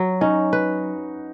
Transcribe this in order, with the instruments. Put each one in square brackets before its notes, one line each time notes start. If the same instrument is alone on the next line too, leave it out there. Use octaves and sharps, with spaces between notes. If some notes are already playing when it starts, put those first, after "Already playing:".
Already playing: [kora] F#3 [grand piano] F#4
[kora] C#4 [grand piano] D#4
[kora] B4